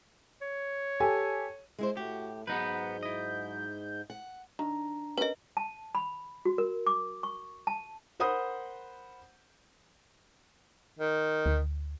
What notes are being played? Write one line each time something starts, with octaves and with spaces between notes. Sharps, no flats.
C#5
G4 A4 G#5
G#3 E4 C5
A2 F#4 G4
G#2 F#3 B3 D#4 B4 G6
E4 D#5
F#5
D#3 D4 A#5
C#4 A#4 B4 D#5
A5
B5
F#4
A#4
D6
C#6
A5
A#4 C5 F#5 B5 D#6 G6
D#3
D2